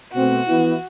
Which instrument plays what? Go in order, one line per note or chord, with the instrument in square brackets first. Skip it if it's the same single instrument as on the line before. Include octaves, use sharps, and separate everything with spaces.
[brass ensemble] B2 A3 C4 [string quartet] F#4
[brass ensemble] E3 B3 E4